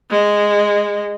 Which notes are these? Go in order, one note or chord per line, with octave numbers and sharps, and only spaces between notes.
G#3